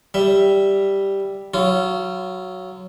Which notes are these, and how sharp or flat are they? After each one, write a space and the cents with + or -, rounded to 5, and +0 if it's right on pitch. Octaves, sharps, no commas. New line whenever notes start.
G3 +0 E5 +0
F#3 +0 F4 -30